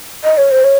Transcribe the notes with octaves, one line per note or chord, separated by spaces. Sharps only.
D#5
C#5
C5
C#5